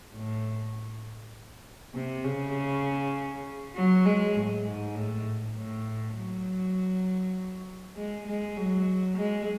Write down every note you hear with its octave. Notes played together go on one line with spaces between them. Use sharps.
A2
C3
C#3
F#3
G#3
A2
G#2
A2
A2
F#3
G#3
G#3
F#3
G#3